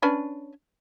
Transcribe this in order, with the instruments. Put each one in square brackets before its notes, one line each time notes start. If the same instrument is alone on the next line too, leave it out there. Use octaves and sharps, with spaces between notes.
[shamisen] C#4 D4 B4